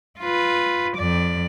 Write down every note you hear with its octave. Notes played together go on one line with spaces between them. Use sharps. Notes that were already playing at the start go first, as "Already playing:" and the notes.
F4 B4
F2 D5